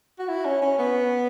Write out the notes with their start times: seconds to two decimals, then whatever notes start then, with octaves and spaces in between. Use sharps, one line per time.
0.19 F#4
0.29 E4
0.45 C#4
0.62 C#4
0.79 B3